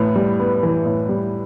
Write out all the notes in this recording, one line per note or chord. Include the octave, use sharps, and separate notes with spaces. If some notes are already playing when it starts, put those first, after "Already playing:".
Already playing: A2 E3 B3
G3
B3
E3
A2
G3